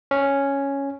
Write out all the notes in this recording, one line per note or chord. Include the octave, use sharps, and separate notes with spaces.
C#4